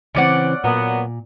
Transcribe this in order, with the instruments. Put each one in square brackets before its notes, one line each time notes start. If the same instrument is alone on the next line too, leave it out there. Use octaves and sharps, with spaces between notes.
[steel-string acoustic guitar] C#3 E3 C4 [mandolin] C#4 D5 F#5
[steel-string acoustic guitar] A#2 [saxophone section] F#3 A#3 B3